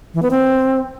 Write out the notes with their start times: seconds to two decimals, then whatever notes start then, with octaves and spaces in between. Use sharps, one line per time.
0.14 E3
0.22 B3
0.31 C4